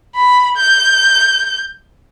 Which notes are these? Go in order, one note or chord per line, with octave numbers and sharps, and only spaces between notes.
B5
G6